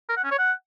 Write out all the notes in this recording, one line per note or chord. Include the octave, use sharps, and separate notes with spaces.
A#4
F#5
C#4
C#5
F#5